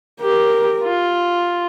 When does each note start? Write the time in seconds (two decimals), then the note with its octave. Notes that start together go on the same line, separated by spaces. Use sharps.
0.21 G4 A#4
0.84 F4